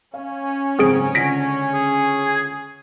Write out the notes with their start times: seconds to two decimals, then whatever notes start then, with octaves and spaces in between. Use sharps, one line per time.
0.14 C#4 F5
0.79 F#1 G#2 C4 G#4 C5 D7
1.15 C#2 D3 A#6 B6 D7
1.74 G#4